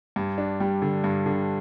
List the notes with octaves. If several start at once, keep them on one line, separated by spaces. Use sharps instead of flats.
G2
D4
G3
D3
G2
D3